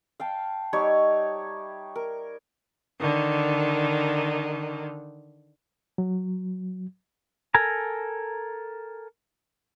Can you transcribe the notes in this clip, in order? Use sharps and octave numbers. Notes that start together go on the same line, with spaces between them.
F5 G5 A5
G3 D#4 C#5 E5
A#4
D3 D#3
F#3
A4 A#4 G#5 A#5